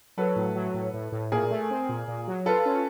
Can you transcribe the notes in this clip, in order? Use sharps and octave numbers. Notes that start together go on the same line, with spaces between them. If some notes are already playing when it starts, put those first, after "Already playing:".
F#3 A4 B4
A2
F#3
A2
A2
A2
A#2 G#4 A#4
A3
C4
A#2
A#2
F#3
F4 A4 B4
C#4